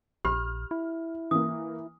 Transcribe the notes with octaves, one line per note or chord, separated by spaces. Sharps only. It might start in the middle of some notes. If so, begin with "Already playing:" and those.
A#1 G4 B5 F6
E4
E3 A#3 D#6